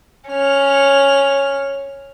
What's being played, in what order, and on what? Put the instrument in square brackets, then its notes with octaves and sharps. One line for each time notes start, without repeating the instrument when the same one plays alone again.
[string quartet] C#4 F6